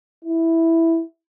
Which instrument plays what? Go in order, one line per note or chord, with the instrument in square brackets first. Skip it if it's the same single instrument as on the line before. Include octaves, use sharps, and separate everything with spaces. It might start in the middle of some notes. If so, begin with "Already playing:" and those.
[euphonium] E4